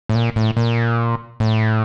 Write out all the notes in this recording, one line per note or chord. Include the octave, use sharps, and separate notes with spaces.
A2
A#2
A2
A#2
A2